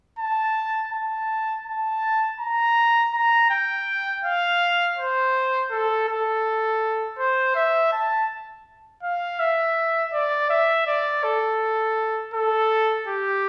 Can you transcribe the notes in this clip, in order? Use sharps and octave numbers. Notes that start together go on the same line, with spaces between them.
A5
A5
A5
A#5
A#5
G5
F5
C5
A4
A4
C5
E5
A5
F5
E5
D5
E5
D5
A4
A4
G4